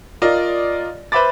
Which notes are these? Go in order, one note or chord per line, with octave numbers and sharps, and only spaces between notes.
F4 A#4 D5 D#5
B4 C5 E5 B5 D6 A6